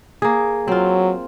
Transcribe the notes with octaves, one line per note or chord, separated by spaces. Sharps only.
A#3 G#4
F#3 C4 F4